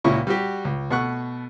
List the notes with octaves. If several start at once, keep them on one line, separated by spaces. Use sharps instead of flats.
C#2 A#2 C#4 E4 F#4 C#6
G3 F#4 G4
C#2
B2 A3 F#5 C#6 F#6